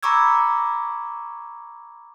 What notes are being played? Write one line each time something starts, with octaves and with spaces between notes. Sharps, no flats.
A#5 B5 C#6 D6 E6 G#6